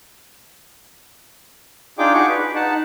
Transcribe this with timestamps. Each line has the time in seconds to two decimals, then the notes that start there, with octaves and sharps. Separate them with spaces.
1.99 D4 D#4 F4 G#4 G5 D6
2.14 F#4 G#4 C#6 D6
2.29 B4
2.55 D#4 F#5 A5